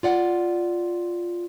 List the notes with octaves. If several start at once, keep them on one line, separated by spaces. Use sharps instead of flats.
F4 D5 F#5